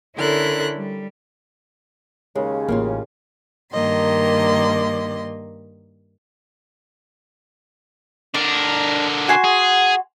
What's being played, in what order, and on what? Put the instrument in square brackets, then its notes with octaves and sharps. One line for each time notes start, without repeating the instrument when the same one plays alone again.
[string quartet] D3 C#4 E4 A4 A#4 F#6
G3
[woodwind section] D#2 C#3 [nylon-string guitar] G#3
[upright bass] A1 [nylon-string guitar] A#3 C#4 F4
[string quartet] G2 D#3 A#3 D#5 C6
[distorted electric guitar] D3 A#4 [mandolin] D4
[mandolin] F#4 G#5 C6
[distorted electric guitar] G#4